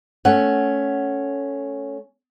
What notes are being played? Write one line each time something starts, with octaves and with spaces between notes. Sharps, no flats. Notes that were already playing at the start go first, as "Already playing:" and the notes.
A3 C#4 F#5